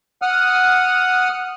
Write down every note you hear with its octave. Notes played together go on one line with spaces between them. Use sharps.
F#5 D#6 F6